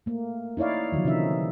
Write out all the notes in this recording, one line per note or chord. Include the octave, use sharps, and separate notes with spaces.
A3 A#3
D#4 E4 C#5 D5 F5
D3 D#3 F3 F#3
C3 E3 C#4 D#4 E5